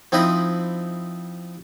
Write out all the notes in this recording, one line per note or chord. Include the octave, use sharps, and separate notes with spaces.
F3 C4 D#4 E4 D#5 B5